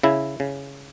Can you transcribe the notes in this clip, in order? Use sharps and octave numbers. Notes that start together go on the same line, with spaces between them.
C#3 E4
C#3